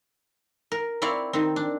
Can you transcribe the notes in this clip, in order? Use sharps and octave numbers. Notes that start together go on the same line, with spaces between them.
A#4
C4 E4 C#5 D5 F5
D#3 C4
D4